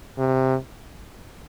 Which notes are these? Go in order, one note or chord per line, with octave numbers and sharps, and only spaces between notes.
C3